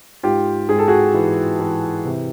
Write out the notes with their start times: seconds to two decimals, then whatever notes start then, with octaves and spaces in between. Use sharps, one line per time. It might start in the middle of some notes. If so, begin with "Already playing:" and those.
0.23 G#2 F4 G4
0.69 G#2 G#4
0.79 A4
0.88 F#4 G#4
1.14 E3
1.60 E3
2.05 C3